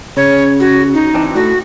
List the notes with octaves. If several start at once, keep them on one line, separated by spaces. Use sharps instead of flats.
C#3 C#5
F#4
D#4
E3 C4 D4
A2 F#4